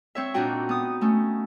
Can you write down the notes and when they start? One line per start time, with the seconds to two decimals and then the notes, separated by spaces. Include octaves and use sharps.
0.15 C4 C#5 E5
0.34 A#2 D4 D#4 F#4 G5
0.69 B3 D#6
1.01 A3 C#4